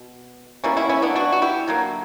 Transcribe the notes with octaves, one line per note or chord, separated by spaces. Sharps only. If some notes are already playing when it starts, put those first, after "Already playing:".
Already playing: B2
B2 G3 A#3 C#4 E4
C#4 E4
C#4 E4
B3 D4
D4 F#4
F#4
E4 G4
D3 F#3 A#3